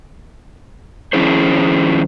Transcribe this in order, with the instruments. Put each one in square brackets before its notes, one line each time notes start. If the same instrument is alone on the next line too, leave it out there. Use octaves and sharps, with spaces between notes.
[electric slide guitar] D#3 F3 C#4 E4 G#4 C5